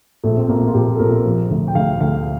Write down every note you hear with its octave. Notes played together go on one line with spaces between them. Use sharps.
A#1 A3
C4
A#1 A#3
F4
A#1 G4
A4
A#1 A#4
F3
D2
G5
D2 F5
D2 F5